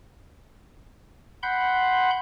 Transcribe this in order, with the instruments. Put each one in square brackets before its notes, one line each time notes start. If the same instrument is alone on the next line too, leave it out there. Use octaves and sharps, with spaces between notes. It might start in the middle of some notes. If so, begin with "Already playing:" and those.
[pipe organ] F#5 B5 C6 G6